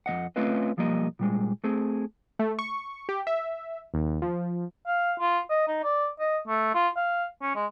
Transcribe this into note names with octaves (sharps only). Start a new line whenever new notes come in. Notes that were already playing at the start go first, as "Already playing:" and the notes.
F2 D#3 D#5 F#5
A3 C4 C#4 F4 B4 D#5
B1 F3 G3 A#3 D#5
A#2 G3 G#3
A3 C4 G#4
A3
C#6
G4
E5
D#2
F3
F5
F4
D#5
D#4
D5
D#5
A3
F4
F5
C#4
G#3